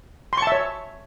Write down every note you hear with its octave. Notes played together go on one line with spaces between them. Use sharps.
C#5 E5 A5 C6 C#6